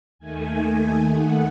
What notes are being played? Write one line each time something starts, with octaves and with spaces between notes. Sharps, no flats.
D#2 D#3 A3 G#5
F#5